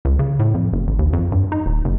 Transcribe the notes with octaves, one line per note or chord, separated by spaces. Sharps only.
C#2
C#3
A2
F2
F#1
A1
D#2
F2
G2
D#4
D#1
F#1